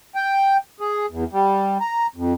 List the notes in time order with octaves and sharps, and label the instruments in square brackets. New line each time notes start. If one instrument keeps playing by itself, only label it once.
[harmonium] G5
G#4
E2
G3
A#5
F2